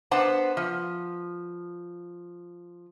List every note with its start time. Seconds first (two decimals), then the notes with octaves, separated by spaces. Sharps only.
0.11 B3 D4 C5 F#5 A5
0.57 F3